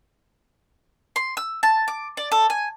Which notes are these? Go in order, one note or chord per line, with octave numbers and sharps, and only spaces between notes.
C6
E6
A5
D6
D5
A4
G#5